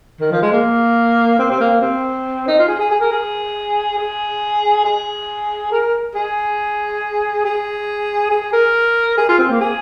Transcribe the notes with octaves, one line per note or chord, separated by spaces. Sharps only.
D#3
F3
G#3
A#3
C4
C4
A#3
C4
D#4
F4
G#4
G#4
G#4
A#4
G#4
G#4
G#4
A#4
G#4
G#4
G#4
A#4
G#4
F4
C4
A#3
G#4